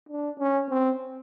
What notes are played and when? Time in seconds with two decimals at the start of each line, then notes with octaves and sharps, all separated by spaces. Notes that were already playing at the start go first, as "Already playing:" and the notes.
0.09 D4
0.39 C#4
0.69 C4